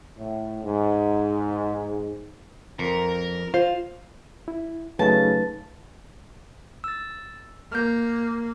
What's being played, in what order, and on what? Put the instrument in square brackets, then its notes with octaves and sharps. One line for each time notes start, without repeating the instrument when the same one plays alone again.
[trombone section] A2
G#2
[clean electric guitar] F2 [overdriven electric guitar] A#4
[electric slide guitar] F4 [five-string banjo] C5
[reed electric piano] E4
[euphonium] C#3 [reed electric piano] F#3 A3 D#4 [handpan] B4 [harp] A5
[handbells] E6 A6
[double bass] A#3 [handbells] F6 G6